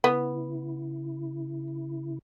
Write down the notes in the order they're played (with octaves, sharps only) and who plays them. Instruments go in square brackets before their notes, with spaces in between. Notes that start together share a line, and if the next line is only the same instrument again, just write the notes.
[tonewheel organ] C#3 E4 [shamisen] B3